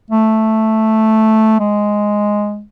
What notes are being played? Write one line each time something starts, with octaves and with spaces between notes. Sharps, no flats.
A3
G#3